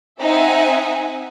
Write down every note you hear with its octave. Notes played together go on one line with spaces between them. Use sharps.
C4 D#4 E5 F#5 G#5